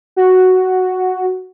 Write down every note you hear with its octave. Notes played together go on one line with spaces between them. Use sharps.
F#4